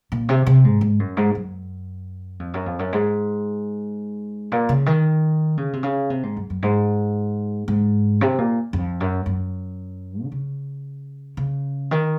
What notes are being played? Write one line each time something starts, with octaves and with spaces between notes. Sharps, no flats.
A#2
C3
C3
G#2
G#2
F#2
G#2
F#2
F2
F#2
F2
F#2
G#2
A#2
C#3
D#3
C#3
C3
C#3
C3
G#2
F#2
F#2
G#2
G#2
C3
A#2
F2
F#2
F#2
D#3
C#3
C#3
D#3